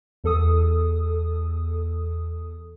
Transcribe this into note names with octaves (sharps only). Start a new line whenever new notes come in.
E2 A4 D#6